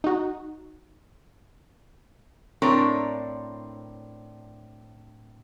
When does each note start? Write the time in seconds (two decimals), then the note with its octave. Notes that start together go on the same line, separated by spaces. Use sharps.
0.04 D#4 F#4
2.62 A2 C4 D4 A#4 C#5